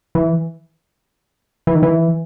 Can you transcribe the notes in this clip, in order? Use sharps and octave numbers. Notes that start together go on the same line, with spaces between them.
E3
E3
D#3
E3